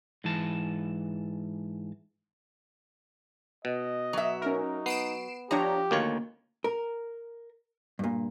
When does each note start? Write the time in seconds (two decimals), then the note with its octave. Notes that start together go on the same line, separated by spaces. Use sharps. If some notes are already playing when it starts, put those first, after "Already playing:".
0.24 G#2 E3 A5
3.65 B2 D#5
4.13 F#3 E5
4.42 C#4 D#4 A#4
4.86 B3 C7 D7 E7
5.51 F3 D4 G4 C#5 A#5
5.91 D2 D#3 A#3 C#5
6.64 A#4
7.99 G2 A#2